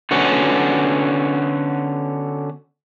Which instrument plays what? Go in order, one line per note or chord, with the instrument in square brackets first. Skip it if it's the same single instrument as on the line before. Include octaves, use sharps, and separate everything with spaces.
[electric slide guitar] D3 B3 C#4 F#4